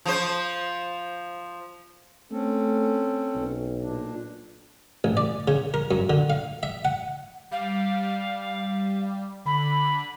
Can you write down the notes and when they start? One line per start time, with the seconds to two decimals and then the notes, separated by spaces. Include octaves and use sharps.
0.06 F3 C5
2.31 A3 C4 C#4 A4
3.35 B1
3.81 A#2 D4
5.04 A1
5.17 D5
5.48 C#3
5.74 A#4
5.91 F#2
6.10 D3
6.30 F5
6.63 E5
6.85 F#5
7.51 G3 F5
9.46 D3 B5